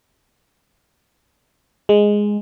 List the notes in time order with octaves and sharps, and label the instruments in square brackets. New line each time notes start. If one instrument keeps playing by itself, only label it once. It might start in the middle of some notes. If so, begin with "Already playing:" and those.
[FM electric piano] G#3